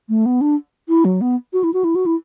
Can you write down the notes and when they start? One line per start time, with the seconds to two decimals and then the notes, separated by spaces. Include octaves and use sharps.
0.09 A3
0.26 B3
0.41 D4
0.89 E4
1.05 F#3
1.21 B3
1.53 F#4
1.64 E4
1.74 F#4
1.84 E4
1.95 F#4
2.06 E4